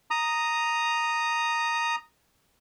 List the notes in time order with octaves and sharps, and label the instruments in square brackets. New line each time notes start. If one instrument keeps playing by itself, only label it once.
[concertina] A#5 D#6